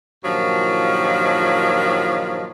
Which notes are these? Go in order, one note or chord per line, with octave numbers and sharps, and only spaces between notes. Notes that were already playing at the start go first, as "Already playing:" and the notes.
G2 A#2 D#3 F3 F#3